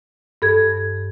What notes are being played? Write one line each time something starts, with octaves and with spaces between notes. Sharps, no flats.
G2 A4 G#6